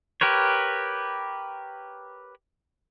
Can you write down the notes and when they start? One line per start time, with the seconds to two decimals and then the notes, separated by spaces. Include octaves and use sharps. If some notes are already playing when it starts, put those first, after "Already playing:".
0.21 G4 A#4 B4 C#5